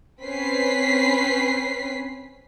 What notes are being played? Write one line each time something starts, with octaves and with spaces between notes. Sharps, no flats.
C4 C#4 B4 B6 C7